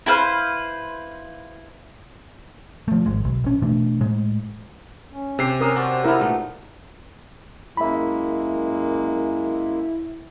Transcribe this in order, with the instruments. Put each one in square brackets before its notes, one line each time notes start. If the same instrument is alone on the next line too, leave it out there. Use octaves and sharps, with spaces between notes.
[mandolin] E4 B4 C5 F5
[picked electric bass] F3 A3
G#1 G#3
B1
A#1 C#4
B2 E3 A3 D4
A2 G#3
[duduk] C#4
[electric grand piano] C3 G4 C7
[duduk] C#4 [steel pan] A#4 D#6
[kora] C#4 D4 F#4 [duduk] C5
[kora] B3 D#4 [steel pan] E4 A#4
[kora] A#2 A3 B3 [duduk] D#4
[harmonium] F#2 G#3 A#3 [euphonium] E4 [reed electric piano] E5 B5